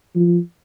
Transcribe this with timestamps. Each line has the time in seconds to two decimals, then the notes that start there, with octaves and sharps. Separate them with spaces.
0.15 F3